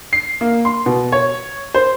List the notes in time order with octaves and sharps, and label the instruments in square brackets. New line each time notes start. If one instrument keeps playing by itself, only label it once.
[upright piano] C7
A#3
C6
B2
C#5
C5